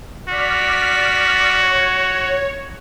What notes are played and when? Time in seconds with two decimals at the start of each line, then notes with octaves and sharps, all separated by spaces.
0.29 F#4 D5 F6 B6
1.61 C#5